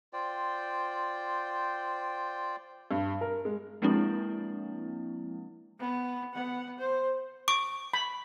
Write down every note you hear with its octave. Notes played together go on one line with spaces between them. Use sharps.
F4 C5 D5 G5
G2
A#4
G#3
F3 G#3 A#3 C4 D4 E4
B3
B3 F#5
C5
C#6 D6
B5